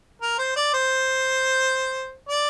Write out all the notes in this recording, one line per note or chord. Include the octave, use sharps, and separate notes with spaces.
A#4
C5
D5
C5
D5